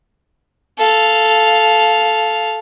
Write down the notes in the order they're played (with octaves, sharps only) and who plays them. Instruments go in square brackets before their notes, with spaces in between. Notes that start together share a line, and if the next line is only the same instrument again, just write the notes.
[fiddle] A4 F5